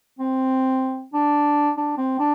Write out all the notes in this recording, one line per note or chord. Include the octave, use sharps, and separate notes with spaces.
C4
D4
D4
C4
D4